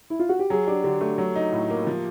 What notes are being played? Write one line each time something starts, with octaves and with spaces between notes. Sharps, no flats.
E4
F4
F#4
G4
F#3 G#4
D4 G4
D3 G4
A3
F#3
D#4
A2
A#3
F3